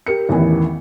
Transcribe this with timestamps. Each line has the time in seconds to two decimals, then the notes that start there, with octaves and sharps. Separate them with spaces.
0.07 G4 A#4 C#7
0.29 A1 E2 D#3 E3